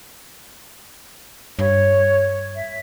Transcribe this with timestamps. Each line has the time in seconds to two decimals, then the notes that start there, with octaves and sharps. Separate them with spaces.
1.59 G2 C#5
2.55 E5